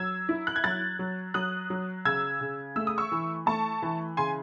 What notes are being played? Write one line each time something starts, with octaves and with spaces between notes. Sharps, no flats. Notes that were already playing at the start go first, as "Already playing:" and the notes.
Already playing: F#3 E6 G#6
E4
F#6
G#6
F#3 F#6 A6
F#3
F#3 D#6 F#6
F#3
C#3 E6 G#6
C#3
A3 E6
D#6
C#6 E6
E3
A3 A5 C#6
E3
C#3 G#5 C6